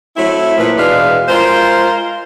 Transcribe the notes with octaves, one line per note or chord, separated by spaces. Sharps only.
F#3 A3 C4 E4
A#2 F3 B4
E2 B2 G#3 D4 B4 F5
G#3 F4 A#4 C5